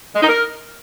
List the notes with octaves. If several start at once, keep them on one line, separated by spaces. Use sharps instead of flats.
G#3
D#4
A#4